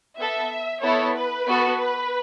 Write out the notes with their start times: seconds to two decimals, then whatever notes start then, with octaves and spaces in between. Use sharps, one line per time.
0.18 B3 A4 E5
0.82 B3 E4 A4 C#5
1.15 B4
1.47 B3 F#4 A4
1.78 B4